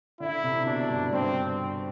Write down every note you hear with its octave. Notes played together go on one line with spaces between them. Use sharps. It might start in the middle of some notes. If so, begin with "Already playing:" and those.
D3 E4
C3
B2 D4
G2
G2 C4